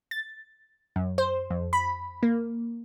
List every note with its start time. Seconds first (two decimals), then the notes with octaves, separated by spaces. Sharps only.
0.11 A6
0.96 F#2
1.18 C5
1.50 F2
1.73 B5
2.23 A#3